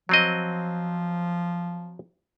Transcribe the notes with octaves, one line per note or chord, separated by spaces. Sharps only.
F3 F#3 C4 D#5